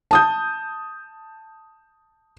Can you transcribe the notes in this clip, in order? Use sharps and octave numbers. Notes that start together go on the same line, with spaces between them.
A5 D#6 G6